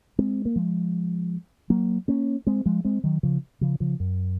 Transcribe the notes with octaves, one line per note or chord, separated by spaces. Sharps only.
G#3 C4
A#3
F3 G#3
F#3 A#3
A#3 C#4
G#3 C4
F3 G#3
G#3 C4
D#3 F#3
C#3 F3
C#3 F3
C#3 F3
F#2